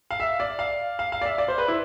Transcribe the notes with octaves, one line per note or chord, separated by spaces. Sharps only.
F5
E5
D5
F5
F5
F5
D5
E5
D5
C5
B4
E4